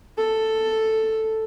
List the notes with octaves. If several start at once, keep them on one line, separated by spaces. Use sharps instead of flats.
A4